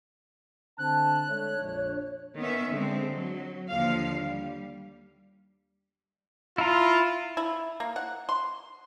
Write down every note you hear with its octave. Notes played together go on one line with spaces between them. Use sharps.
D3 C4 A5 F#6
G#3 A3 D4 C#5
A#1 F2 D4
D#3 B3 C#4 E5
D3 G#3 C4
F#3
D#2 D3 F3 F5
G3
E4 F4 A#5
E4
A#3
F#5
C6